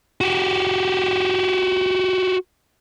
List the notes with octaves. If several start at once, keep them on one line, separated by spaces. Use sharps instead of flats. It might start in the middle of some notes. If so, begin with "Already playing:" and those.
F#4 G4